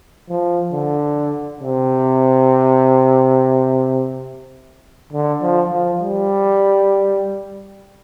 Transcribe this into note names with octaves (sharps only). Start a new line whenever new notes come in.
F3
D3
C3
D3
F3
F3
G3